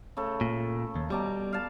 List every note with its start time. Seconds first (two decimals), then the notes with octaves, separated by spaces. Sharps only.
0.17 C#3 A3
0.41 A#2
0.96 D#2
1.10 B2 G3 D5 A#5
1.53 F5 A5